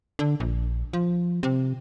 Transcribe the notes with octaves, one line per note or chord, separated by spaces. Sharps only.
D3
A#1
F3
C3